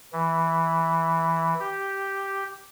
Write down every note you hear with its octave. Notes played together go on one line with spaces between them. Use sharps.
E3
G4